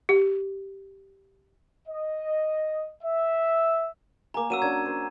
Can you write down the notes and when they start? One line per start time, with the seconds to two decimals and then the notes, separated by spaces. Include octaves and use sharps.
0.09 G4
1.87 D#5
3.02 E5
4.34 A#3 G#5 A#5 D6
4.50 F#3 A#3 C#4 E6 D#7 E7
4.62 C#4 D4 A#4 G#6
4.86 C5